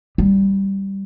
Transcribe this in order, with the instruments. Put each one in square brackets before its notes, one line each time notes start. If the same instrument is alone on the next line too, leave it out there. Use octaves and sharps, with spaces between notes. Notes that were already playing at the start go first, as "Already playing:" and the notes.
[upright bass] G3